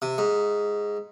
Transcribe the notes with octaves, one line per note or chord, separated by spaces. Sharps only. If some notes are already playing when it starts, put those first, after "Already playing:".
C3
G#2